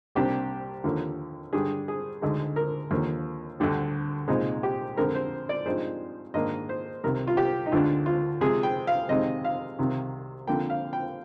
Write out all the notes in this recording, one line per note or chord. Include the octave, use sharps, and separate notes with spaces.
C2 C3 G3 A#3 D4 G4
D#2 D3 F3 A#3
G2 D3 G3 D4 G#4
G#4
D2 D3 G#3 D#4
A#4
D#2 D3 F3 A#3
D2 D3 G3
C2 A#2 G#3 C4 D#4
G4
F2 D3 G#3 C4 A#4
C5
D5
G2 F3 G#3 C4 D#4 C5
G#2 D#3 A#3 D4 D#5
C5
C2 C3 D#3 A#4
F4
G4
D#4
D2 D3 G#3 D4 F4
F4
C3 F3 G#3 G#4
G5
F5
F2 C3 D#3 G#3 D#4 D#5
F5
C2 C3 D#3
F2 D3 F3 A#3 G5
F5
G5